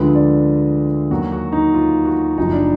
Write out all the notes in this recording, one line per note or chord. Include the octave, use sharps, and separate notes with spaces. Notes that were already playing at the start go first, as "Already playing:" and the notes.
Already playing: D2 D3 F3 G#3 B4
D5
D#2 D#3 F#3 F#4
F#4
D#4
F4
F#4
F#1 F#2 F3 D#4
D4